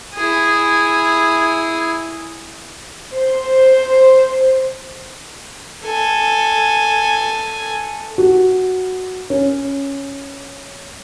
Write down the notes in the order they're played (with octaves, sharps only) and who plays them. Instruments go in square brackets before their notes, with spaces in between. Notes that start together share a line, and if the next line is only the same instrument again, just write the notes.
[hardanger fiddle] E4 G#4
[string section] C5
[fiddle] A4 G#5
[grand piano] F#4
C#4